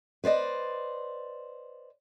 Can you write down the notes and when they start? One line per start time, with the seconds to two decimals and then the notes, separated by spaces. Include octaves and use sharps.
0.24 B4 C5 D5 D#5